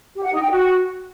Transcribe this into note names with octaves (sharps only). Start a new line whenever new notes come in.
G4
F#5
D#4
G5
F#4